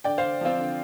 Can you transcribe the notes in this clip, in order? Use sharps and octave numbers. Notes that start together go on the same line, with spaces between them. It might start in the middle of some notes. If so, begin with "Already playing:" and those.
D3 D5 G5
C5 F5
D3
F3 C4 F4
D3